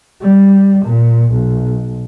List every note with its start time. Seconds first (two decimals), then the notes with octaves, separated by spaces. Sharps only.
0.21 G3
0.86 A#2
1.32 B1